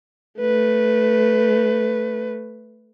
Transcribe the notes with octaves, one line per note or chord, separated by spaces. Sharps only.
A3 B4